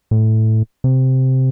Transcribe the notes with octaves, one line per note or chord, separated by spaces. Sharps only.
A2
C3